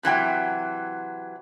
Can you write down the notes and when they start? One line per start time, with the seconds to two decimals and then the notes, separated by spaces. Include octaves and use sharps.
0.03 C3 E3 F#3 G5